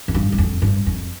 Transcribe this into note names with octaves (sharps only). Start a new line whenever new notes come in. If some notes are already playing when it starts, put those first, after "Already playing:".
F2
G2
G2
F2
G2
F2